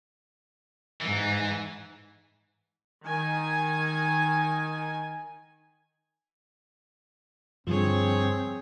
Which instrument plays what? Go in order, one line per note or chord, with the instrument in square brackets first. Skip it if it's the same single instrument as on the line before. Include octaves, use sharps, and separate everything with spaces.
[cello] G#2 [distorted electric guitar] E3
[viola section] D#3 G#5
[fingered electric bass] G2 [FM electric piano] D3 F3 [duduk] C4 [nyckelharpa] G#4 C#5